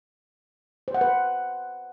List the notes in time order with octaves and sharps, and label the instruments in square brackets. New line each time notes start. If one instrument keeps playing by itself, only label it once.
[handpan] C5
F#5
B4